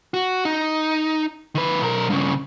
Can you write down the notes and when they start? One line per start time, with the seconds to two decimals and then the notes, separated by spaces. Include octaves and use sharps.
0.14 F#4
0.45 D#4
1.55 D#3 B4
1.81 B1 A#4
2.10 G2 C#3